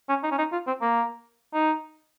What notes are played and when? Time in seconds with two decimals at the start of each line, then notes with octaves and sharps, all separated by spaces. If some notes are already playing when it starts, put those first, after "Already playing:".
0.09 C#4
0.23 D#4
0.31 C#4
0.38 D#4
0.52 F4
0.67 C4
0.82 A#3
1.54 D#4